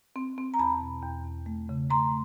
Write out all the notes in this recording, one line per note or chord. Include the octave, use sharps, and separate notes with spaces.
C4
C4
A#5
E2 A5 B5
B2
E2
E2
A3
C#3
A3 A#5 C6